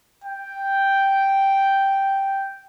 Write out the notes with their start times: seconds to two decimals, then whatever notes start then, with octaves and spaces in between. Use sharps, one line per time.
0.24 G5